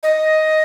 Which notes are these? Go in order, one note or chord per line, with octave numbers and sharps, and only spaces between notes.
D#5